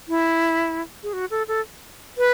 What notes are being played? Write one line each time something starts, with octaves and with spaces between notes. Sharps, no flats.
E4
G#4
F#4
A4
A4
B4